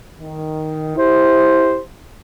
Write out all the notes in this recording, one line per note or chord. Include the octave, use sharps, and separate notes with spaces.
D#3
E4 G4 C5